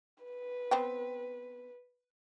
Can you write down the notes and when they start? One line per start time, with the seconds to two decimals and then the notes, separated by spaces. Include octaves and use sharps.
0.24 B4
0.71 B3 C4 G5